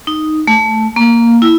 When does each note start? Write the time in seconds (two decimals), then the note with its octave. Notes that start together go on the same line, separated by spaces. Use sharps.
0.07 D#4
0.47 A3
0.96 A#3
1.42 E4